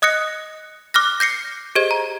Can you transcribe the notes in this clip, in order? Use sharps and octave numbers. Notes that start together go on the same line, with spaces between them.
D#5 D#6 F#6 A#6 C#7
D6 F6 F#6 A#6
G6 A#6 C7 C#7
G4 G#4 C5 D#5 G#6
A#5